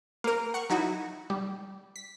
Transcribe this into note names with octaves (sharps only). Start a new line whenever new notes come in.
A#3 A#4
F#5 C#6
F#3 D#4 E4 F#4
G3
B6